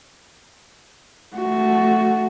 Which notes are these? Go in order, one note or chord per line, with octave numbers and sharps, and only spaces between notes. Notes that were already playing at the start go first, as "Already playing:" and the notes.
A3 F#4